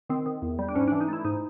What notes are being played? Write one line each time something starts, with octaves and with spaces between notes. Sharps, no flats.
D#3 C4
D#3
E2
G3
D4
G#2 C#4
E3 D4
D#4
A3 E4
G#2 D#4